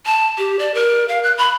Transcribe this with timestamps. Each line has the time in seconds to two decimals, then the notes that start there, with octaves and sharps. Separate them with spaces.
0.06 A5
0.38 G4
0.59 D5
0.74 A#4
1.08 F5
1.23 F#6
1.38 B5